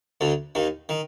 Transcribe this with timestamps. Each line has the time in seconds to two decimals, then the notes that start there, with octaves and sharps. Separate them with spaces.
0.21 D2 D3
0.55 D#2 D#3
0.89 D#3